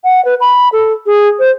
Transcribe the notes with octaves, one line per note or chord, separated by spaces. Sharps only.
F#5
B4
B5
A4
G#4
C5